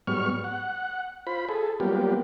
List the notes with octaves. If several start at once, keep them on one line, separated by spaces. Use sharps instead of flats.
G#2 F#3 G3 B3 C#6 F6
F#5
F4 C5 B5
G#4 A4
F#3 G3 A#3 B3 F4 G4